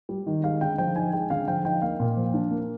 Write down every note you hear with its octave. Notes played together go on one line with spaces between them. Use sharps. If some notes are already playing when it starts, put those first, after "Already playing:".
G3
D#3
G#3 F5
D3 G5
F3 G5
D#4 G#5
G#3 G5
D3 F5
F3 G5
D#4 G5
A#3 F5
A#2
F3
D4
A#3